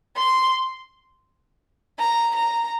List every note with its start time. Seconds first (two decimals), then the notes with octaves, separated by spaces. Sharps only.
0.17 C6
1.99 A#5
2.35 A#5